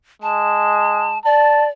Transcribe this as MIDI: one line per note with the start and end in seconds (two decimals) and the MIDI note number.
0.22 1.17 56
0.22 1.19 81
1.25 1.70 74
1.25 1.68 81